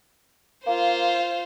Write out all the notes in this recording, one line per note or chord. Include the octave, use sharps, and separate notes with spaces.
A#3 F4 C5